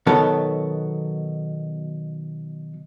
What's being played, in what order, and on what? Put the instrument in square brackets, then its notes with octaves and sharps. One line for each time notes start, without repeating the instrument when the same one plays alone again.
[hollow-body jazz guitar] B2 D#3 F#3 B3 A4